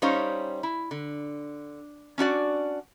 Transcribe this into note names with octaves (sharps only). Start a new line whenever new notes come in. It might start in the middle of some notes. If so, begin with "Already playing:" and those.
G3 C#4 D#4 C5 C#5 F5
E4
D3
C#4 D4 F#4 D5